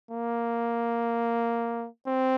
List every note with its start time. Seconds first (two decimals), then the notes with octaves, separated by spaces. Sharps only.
0.11 A#3
2.07 C4